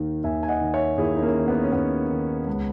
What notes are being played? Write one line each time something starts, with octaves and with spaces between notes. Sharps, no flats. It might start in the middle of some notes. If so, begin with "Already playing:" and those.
Already playing: D#2 D#3
D#2 E5 G#5
G#5
D#5 F#5
D#3
C#5 E5
D#2 E4 G#4
D#4
A#3 C#4
D#3
B3
C#4
D#2 B3
D#3
C#2